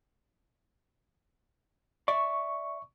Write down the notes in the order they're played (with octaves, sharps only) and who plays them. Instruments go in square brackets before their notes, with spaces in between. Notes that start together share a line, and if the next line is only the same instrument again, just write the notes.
[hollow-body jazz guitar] D5 E5 [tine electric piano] C#6